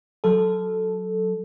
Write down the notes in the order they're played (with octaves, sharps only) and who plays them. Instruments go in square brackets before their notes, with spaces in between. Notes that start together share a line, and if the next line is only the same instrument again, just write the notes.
[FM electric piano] F#3 A4